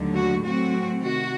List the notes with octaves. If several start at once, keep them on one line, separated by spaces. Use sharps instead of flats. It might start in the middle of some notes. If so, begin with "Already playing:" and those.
Already playing: D#2 D3 F#3 A3
F#4
A2 F#3 A3 C4 F#4
C3 D#3 F#4